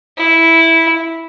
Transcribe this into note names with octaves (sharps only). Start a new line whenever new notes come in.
E4